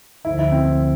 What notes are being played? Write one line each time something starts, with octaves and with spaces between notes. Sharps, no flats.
D2 D3 F3 E4
E4
C4